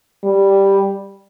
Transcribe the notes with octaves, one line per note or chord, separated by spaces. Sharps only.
G3